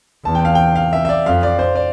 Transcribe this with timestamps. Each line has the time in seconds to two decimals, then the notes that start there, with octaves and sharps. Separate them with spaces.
0.24 E2 A5
0.35 G5
0.45 F5
0.55 G5
0.76 F5
0.93 E5
1.05 E5
1.09 D5
1.26 F2 F5
1.43 D5
1.59 C5
1.76 D5